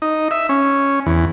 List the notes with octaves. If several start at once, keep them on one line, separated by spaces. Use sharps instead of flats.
D#4
E5
C#4
E2